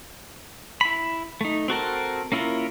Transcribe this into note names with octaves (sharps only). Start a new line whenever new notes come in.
E4 B5
A3 D#4
C4 F#4 A4 A#4
A#3 C#4 E4 F4 A#4